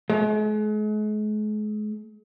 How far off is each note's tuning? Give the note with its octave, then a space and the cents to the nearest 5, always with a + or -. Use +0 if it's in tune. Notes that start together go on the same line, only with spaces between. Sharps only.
G#3 +40